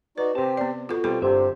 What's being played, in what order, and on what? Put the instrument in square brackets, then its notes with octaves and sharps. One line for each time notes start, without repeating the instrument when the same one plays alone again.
[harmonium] D#4 F#4 D5 [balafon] B4
[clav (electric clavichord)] C3 A5 [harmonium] C4 G4 C5
[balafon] B3 D5
[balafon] F4 A4 [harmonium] F#4
[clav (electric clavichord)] B2 G3 [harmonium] C4 F4 [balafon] A4
[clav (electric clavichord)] G1 E5 [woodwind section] C3 [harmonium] D4